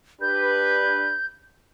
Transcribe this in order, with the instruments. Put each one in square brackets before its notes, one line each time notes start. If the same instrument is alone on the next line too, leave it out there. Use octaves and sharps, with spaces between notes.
[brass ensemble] D4 G4 B4 [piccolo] G6